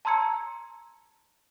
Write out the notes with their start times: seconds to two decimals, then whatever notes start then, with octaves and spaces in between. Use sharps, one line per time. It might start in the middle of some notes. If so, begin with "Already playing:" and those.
0.05 A5 A#5 C6 E6 G#6 C#7